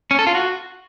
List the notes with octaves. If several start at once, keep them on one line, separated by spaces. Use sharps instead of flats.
C#4
A4
F4
F#4